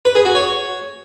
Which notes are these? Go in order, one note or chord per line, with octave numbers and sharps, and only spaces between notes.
B4
G#4
F#4
C#5